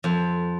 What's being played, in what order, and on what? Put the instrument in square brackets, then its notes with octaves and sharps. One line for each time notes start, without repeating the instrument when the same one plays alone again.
[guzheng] F2